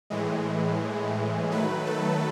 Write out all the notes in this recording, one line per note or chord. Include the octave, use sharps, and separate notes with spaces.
A2 E3 G#3
D#3 F#3 A3 B4
A4